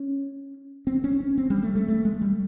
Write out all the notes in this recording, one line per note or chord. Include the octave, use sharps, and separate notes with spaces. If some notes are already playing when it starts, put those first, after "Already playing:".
Already playing: C#4
C4
C#4
C#4
C4
G3
A3
A3
A3
G#3
G3